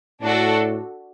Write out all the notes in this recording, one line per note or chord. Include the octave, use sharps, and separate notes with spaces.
A2 D4 F#4 A4